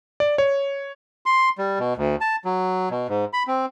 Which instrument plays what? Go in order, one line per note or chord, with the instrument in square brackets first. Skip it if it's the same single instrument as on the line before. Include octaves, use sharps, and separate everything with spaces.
[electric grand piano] D5
C#5
[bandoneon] C6
G3
B2
D2
A5
F#3
B2
G#2
B5
C4